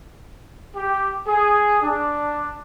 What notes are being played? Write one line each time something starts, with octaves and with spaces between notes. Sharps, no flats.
G4
G#4
D4